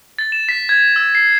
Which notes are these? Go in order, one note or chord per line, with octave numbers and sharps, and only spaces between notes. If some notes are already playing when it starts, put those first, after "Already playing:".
A6
E7
B6
G#6
E6
C7